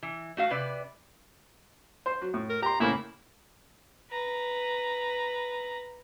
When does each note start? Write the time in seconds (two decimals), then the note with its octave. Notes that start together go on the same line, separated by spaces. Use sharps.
0.02 E3
0.37 A3 F#4 F5
0.50 C3 B4 D5
2.06 C5 C6
2.21 F#3
2.34 A2
2.50 A#4
2.62 G4 A#5 C6
2.80 A2 C#3 A#3 E4
4.11 B4 A#5